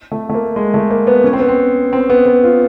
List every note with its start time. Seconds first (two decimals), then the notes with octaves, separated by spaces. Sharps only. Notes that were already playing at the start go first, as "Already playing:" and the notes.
0.12 A3
0.30 A3
0.34 A#3
0.56 G#3
0.74 A3
0.91 A#3
1.07 B3
1.24 C#4
1.33 C4
1.40 B3
1.48 C4
1.93 C4
2.10 B3
2.26 B3
2.43 F4